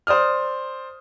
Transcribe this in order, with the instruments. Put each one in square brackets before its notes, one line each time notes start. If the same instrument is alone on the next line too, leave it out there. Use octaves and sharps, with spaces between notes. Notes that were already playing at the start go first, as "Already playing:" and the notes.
[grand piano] C5 D5 D#6 F6